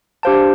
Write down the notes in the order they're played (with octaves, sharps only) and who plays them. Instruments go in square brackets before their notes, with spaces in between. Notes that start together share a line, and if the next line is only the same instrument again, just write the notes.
[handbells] D4 G4 C5 F5 A5